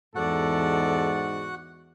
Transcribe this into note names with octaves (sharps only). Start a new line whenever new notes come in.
E2 G#2 F#4 A4 D5 F#5